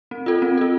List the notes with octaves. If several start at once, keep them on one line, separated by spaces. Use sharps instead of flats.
C4
F4 A4
C4
F4 A4